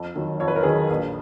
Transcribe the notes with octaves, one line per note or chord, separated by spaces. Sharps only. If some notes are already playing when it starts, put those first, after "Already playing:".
Already playing: F2
D#3 F#3
F2 C#5
B4
A#4
D#3 F#3 G#4 B4
A#1